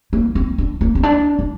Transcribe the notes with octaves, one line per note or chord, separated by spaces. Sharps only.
A#3
C4
D4
A#3
C4
D4
D4